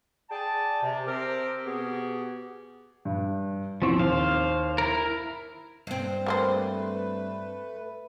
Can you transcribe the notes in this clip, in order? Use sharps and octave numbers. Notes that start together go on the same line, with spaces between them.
G#4 D5 G5 A5
C3
C4 G4 A#4
B2 B3 G4 G#4
G2
A1 E2 F3 C4 C#6
D#2 C5 F5
E4 A#4
G2 C4
G3 A3 A#3 B4 C5